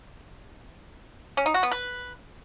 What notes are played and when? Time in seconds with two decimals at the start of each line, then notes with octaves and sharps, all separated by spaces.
1.37 C#4
1.46 D#4
1.54 F#4
1.63 B3
1.72 B4